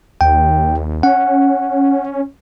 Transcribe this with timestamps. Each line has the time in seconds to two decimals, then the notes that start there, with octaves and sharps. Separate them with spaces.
0.21 D#2 G5
1.03 C#4 F#5